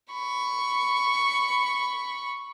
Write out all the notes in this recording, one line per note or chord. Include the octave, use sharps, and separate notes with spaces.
B5 C#6